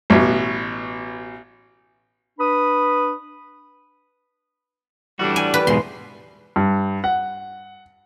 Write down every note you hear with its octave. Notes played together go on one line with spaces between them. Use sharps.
A1 B2
D4 B4 B5 D#6
A2 E3 G3 D4 F#4
G#5
B4
E2 G#2 B2 C6
G2
F#5